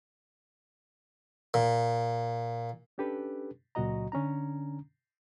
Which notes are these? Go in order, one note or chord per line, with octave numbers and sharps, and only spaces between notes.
A#2
C#4 D4 G4 A4 B4
C#2 A#2 F#3 F#4 D#5 A#5
D3 C#4 D4 A#5